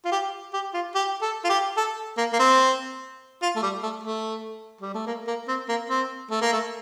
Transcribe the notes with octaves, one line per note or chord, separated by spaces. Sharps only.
F4
G4
G4
F4
G4
A4
F4
G4
A4
A#3
A#3
C4
F4
A3
G3
A3
A3
G3
A3
A#3
A#3
C4
A#3
C4
A3
A#3
A3